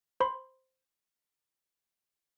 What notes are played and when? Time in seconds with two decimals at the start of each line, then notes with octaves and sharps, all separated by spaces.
0.20 C5 B5 C6